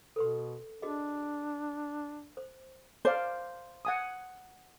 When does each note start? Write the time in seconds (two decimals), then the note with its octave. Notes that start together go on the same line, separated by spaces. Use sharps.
0.16 B2 A4 B4 C6
0.82 D4 F#4 G#4 D#5
2.37 C5
3.05 C5 D5 F5
3.85 F#5 G#5 D#6